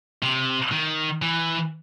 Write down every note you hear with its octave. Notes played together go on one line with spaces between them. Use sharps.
C3
D#3
E3